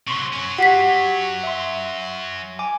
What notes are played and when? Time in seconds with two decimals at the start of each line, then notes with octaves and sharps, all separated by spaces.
0.07 C3 F#3 C6 C#6
0.33 F#3 C#4
0.58 F#4 G4 F#5 B6 C7
1.43 E5 C6
2.59 G#5 D6